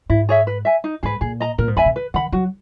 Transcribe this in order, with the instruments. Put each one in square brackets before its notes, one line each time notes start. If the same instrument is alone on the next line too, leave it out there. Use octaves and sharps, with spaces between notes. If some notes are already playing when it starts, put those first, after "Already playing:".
[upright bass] G#2 [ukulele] E4
[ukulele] G#4 C#5 E5
B4
E5 G#5
D#4
[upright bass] G#2 [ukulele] G#4 B4
[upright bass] A#2 [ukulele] G#4
[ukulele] D#5 A#5
[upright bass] A#2 [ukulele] A#4
[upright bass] G#2
[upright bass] E2 [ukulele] E5 G#5 B5
[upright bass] B2
[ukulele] B4
[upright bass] D#3 [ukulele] F#5 B5
[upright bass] F#3 [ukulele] F#4